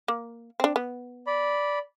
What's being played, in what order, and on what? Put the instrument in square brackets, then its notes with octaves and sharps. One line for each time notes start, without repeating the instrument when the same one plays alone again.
[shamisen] A#3
C4 D4
B3
[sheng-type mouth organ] D5 B5